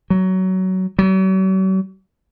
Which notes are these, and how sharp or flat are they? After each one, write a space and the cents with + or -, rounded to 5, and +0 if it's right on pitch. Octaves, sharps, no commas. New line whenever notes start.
F#3 +15
F#3 +45